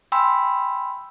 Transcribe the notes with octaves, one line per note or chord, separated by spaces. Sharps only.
G5 G#5 B5 C6 E6